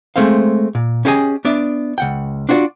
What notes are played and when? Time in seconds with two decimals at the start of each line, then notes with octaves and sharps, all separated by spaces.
0.16 G#3 A3 C4 C5 F5
0.75 A#2
1.05 C#4 E4 G4 G#4 D#5 G#5
1.45 B3 D4 D5 E5
1.98 C#2 F#5 G5
2.49 D4 F4 F#4 C#5 D5